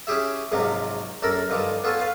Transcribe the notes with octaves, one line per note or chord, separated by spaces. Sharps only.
C#4 E4 G4 G#4 E5
A#1 G#2 C3 F3 F#3
A#1 F#2 A4 A#4 B5
G2 D3 D#3 F3
B3 F4 A4 C#5 G#5
B4 F5